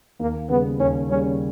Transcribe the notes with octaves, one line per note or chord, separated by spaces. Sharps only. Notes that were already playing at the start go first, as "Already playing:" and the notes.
D#2 A#3
C#3 G3 B3
D#2 C#4
C#3 G3 C#4